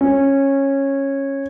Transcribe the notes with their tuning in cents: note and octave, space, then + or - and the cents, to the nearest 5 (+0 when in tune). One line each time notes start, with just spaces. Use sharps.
C#4 -15